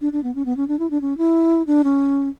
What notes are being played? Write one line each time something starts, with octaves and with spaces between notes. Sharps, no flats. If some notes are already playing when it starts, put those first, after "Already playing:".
D4
D4
B3
C#4
B3
C#4
D4
E4
D4
C#4
E4
D4
C#4